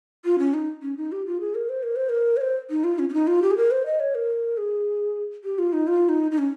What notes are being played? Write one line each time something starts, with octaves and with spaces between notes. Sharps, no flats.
F4
C#4
D#4
C#4
D#4
G4
F4
G#4
A#4
C5
A#4
C5
A#4
C#5
C5
D#4
F4
C#4
C#4
D#4
F4
G4
G#4
A#4
C5
D#5
C#5
A#4
G#4
G4
F4
D#4
F4
D#4
D#4
C#4